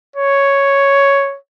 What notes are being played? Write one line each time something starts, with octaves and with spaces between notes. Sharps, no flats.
C#5